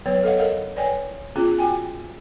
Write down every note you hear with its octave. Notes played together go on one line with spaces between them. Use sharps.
F#3 B3 B4 C#5
A4 C#5 D#5 F5 F#5
A4 A#4 D#5 F#5
B4 C#5 D5 G5 G#5
B3 C#4 F4 G#4
F#4 G5 G#5